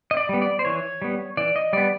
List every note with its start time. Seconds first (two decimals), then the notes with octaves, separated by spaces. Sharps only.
0.11 D#5
0.17 D5
0.29 G3 B3
0.42 D5
0.59 C5
0.65 E3 C#5
1.02 G3 B3
1.37 E3 D5
1.56 D#5
1.73 G3 B3 D5